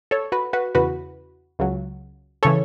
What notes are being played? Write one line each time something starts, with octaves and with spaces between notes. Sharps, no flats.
A4 C#5
F#4 B4
F#4 B4
E2 C#3 E3 F#4 B4
C#2 C#3 F#3
C#3 E3 A4 C#5